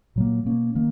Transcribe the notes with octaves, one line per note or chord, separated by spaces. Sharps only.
A#2 F#3 A#3
B2 A#3 C#4
D#3 A#3